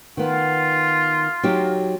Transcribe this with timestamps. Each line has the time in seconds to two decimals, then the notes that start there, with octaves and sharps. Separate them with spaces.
0.17 D#3 B3 F4
1.43 F#3 D#4 G4